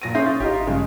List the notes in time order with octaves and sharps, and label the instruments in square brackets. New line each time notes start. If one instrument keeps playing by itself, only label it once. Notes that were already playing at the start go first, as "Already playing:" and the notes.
[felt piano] A#2 A#6 D#7
[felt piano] C#4 G#4 C7 [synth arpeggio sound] E5 C6 G6
[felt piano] C#4 [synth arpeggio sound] A6
[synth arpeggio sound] G#1 [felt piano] D#4 F4 G4
[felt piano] G2 C#3 G#3